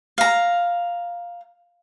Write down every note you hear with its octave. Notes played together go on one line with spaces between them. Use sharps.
F5 A#5